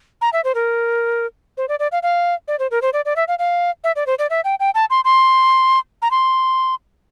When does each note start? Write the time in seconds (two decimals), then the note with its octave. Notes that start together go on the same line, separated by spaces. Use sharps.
0.21 A#5
0.33 E5
0.44 C5
0.55 A#4
1.57 C5
1.69 D5
1.80 D5
1.92 F5
2.03 F5
2.48 D5
2.59 C5
2.71 A#4
2.82 C5
2.93 D5
3.05 D5
3.16 E5
3.28 F5
3.39 F5
3.84 E5
3.96 D5
4.07 C5
4.19 D5
4.30 E5
4.44 G5
4.60 G5
4.75 A5
4.90 C6
5.05 C6
6.02 A#5
6.11 C6